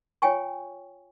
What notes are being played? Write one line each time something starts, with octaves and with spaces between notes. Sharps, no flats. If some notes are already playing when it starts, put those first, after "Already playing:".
F4 C#5 G5 G#5 C#6